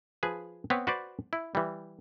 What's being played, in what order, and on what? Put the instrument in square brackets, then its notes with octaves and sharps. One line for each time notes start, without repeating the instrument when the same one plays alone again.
[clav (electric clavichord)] F3 G#4 B4
B3 C4 B4 C#5
F#4 B4 C5 D5
E4
E3 G3